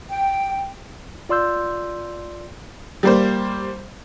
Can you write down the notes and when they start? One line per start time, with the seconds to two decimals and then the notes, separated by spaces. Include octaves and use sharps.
0.10 G5
1.29 F4 D5 C6 E6 G6
3.03 G3 A#3 C5